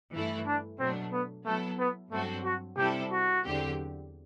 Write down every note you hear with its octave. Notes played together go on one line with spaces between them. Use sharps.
G2 E3 A3 E4
D4
B2 F#3 A3 C4 D4
B3
F#3 A3 B3 E4 A4
B3
G2 F#3 A3 C4 F#4 A4
F#4
C3 G3 C4 E4 G4 A4
F#4
E2 D3 F#3 C4 G4